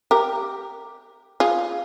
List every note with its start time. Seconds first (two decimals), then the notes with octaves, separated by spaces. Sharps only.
0.11 G4 A#4
1.40 F4 G#4